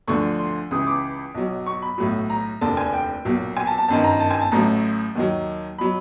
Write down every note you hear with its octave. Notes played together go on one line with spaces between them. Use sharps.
D2 D3 F3 C#6
C6
C#2 C#3 E3 D#6
D6
B1 B2 F#3
C#6
B5
B1 A2 F#3
A#5
F1 D#2 D3 A5
G#5
G5
B1 A#2 F#3
G#5
A5
A5
G1 F#2 D#3 A5
A#5
A5
G#5
A5
A1 A2 F#3 A#5
D#2 D#3 F#3
B2 F#3 B5